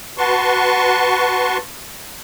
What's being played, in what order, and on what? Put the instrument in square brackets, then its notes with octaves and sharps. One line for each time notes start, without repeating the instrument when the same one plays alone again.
[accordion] F#4 B4 A5 C6 C#6